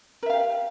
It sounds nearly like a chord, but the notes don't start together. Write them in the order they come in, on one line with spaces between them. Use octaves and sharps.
A#4 E5 F5 G4